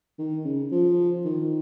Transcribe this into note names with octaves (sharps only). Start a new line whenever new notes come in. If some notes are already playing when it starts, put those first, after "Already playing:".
D#3
C#3
F3
D#3